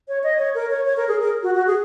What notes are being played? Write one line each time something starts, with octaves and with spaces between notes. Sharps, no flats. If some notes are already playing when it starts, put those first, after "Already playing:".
C#5
D#5
C#5
A#4
C#5
C#5
A#4
G#4
A#4
F#4
F#4
G#4